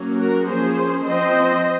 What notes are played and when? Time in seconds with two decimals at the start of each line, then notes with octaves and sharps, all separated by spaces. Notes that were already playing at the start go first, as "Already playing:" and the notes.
Already playing: F#3 A#3 C#4
0.15 F#4 A#4
0.45 F3 A#3 C#4 G#4 C5
1.05 F3 C4 C5 D#5